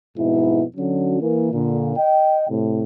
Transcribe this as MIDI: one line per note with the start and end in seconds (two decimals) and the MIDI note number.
0.17 0.63 41
0.17 0.63 44
0.17 0.63 47
0.17 0.63 64
0.77 1.19 50
0.77 1.19 54
0.77 1.19 61
0.77 1.19 66
1.20 1.48 52
1.20 1.48 58
1.52 1.93 46
1.52 1.93 50
1.96 2.47 75
1.96 2.47 79
2.50 2.84 45
2.50 2.84 48